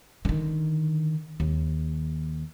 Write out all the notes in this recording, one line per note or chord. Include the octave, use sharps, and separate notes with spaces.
D3 D#3
D#2